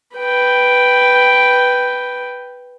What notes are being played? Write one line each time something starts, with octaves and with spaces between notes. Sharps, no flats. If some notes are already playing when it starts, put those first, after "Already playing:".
B4 G5